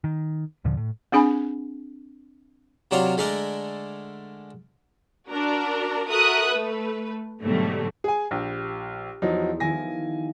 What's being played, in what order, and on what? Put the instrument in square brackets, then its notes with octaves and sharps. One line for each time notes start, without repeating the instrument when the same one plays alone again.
[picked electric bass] D#3
D#2 A#2 D3 F3
A2
[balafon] C4 D4 G#4 G#5 B5
[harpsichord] C3 F#3 D4 F4 C#5 F5
D3 G#3 A3 G#4 A#4 D5
[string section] D4 F#4 A#4
F#4 A4 A#4 E5 D#6 F#6
A3 B4
G#2 B2 D3 F#3 G3 A3
[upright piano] G#4 G#5
[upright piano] A#1 [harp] G4
[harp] E2 B3 [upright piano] F3 F#3 D#4
[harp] D#3 F3 E4 [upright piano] G#5 A#6